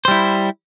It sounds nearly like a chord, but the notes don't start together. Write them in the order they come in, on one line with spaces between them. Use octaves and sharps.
C5 G3 E4